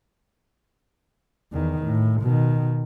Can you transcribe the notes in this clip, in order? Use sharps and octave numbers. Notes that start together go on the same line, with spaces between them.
E2 D#3
A2
B2 D#3